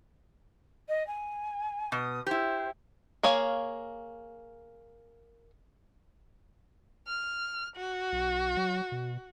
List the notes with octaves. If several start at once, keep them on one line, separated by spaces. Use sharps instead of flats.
D#5
G#5
B2 D#6
E4 G4 C5
A#3 G#4 C#5 F5
F6
F#4
B1
F#3
B2